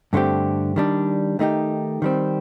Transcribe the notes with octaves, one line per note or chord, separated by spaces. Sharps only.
G2 D3 A3 C4 G4
D#3 G3 D4
D#3 A3 D#4 G4
D#3 G3 C4